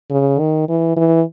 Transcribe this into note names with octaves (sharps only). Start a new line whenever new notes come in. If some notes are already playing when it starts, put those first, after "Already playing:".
C#3
D#3
E3
E3